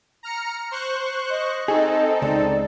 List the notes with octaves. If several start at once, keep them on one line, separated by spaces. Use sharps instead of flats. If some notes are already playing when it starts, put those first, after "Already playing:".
A#5 F6 C#7
C5 C#6 F#6
D#5
C4 D#4 G#4 A4
C#2 D5